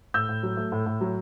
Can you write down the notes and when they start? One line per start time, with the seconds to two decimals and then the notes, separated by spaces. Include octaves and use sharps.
0.14 A2 E6 G6
0.29 A2
0.43 F#3
0.57 A3
0.72 A2
0.86 A2
1.01 F#3